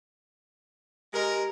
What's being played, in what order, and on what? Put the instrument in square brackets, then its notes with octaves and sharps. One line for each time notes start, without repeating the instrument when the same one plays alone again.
[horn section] G#3 A#4 [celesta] G4 D#5